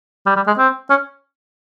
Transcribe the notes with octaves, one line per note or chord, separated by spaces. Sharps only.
G3
G3
G#3
C4
C#4